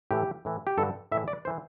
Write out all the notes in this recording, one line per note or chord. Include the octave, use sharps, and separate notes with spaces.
A2 E3 G4
A2 E3
G4
G2 D3 A4
A2 E3 E5
D5
E3 C5